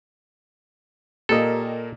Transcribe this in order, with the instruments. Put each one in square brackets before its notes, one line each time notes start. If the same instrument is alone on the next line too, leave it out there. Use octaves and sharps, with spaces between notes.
[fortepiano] A#2 A#3 [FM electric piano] G4 A#4 D#5 [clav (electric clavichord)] A4